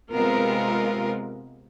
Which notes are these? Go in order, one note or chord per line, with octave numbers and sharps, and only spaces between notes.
C3 G#3 B3 C4 F4 A#4